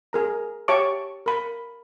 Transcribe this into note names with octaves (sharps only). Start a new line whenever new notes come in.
G#4 A#4 A#5
G4 C#5 E5 A5 C#6 D6
A#4 B5